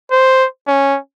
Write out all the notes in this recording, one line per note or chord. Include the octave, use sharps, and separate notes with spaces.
C5
C#4